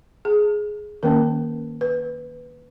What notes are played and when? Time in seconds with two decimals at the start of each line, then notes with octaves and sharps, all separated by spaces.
0.25 G#4
1.03 D#3 A#3 C#4 A#4
1.81 B4